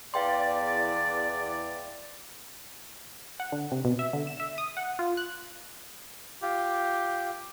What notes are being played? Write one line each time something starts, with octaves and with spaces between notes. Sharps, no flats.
E2 D5 F5 G5 C6
F#5
D3
C3
B2
E5
D3
E7
E5
D#6
F#5
F4
F#6
F4 G4